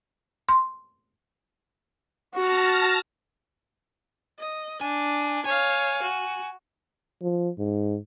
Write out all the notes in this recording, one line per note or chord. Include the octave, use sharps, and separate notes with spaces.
C6
F#4 A5 F6 A#6
D#5
D4 G#5
C#5 F5 G#5
F#4
F3
G#2